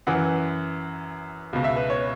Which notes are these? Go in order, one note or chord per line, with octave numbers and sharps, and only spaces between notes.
F#2 E3 F#5
C#2 B2
E5
B4
C#5